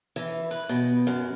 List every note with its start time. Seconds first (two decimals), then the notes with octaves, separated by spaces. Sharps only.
0.16 E3
0.51 B4
0.69 B2
1.07 F#2